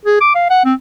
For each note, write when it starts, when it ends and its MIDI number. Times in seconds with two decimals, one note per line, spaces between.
0.05 0.19 68
0.21 0.32 86
0.35 0.48 77
0.50 0.63 78
0.65 0.73 60